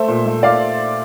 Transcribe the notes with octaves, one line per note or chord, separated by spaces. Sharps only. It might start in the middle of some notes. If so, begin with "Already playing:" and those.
Already playing: A3 C5 E5
A#2
A3
A#2 D5 F5